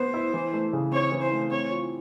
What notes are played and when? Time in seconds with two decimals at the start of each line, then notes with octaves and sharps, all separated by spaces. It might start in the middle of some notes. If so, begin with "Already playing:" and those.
Already playing: B3 C5
0.14 E4
0.34 E3
0.53 A3
0.73 C#3
0.92 C4 C#5
1.12 E3
1.22 C5
1.32 A3
1.51 C4 C#5
1.71 F4